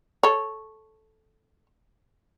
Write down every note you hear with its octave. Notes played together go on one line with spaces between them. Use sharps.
A4 C#5